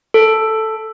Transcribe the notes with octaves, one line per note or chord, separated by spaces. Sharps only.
A4